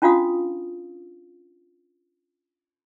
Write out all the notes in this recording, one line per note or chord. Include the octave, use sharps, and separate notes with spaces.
C#4 D4 F4 F#4 F5 D#6